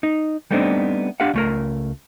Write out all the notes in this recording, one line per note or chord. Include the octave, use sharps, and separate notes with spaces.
D#4
G3 A3 B3 C4 D4 D#4
D4 G4 F5 F#5
C#2 A3 A#4